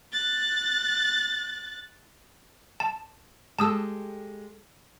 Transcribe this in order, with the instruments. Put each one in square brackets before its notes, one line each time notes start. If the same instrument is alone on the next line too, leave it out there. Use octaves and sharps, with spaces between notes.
[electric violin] F#6 A6
[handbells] A5
[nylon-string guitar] G#3 G4 A4 [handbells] A5 D#6 E6